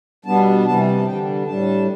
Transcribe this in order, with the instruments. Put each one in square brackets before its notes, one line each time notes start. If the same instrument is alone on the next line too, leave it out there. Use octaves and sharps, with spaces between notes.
[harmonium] B2 G3 B3 D4 A5
C3 E3 G3 A5
A5
D3 G3 D4 G5
A2 G3 D4 A5